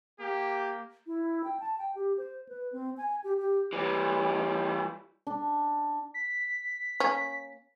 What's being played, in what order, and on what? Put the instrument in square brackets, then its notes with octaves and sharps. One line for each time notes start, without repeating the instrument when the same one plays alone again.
[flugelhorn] A#3 [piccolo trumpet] G4
[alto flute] E4
G5
A5
G5
G4
C5
B4
C4
G#5
G4
G4
[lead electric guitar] E3 G3
[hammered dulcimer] D4
[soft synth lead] B6
[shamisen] A#3 C#4